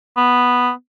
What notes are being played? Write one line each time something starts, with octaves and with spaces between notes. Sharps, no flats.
B3